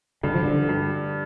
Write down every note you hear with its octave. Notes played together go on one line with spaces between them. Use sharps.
G2 D3
F3
D3
G2